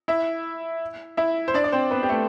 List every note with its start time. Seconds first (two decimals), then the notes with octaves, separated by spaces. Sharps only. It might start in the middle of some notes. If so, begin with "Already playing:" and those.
0.08 E4 E5
1.17 E4 E5
1.48 C5
1.54 D4 D5
1.64 D5
1.72 C4 C5
1.91 B3 B4
2.03 G4
2.09 A3 A4